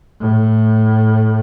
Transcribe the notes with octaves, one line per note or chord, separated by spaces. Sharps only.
A2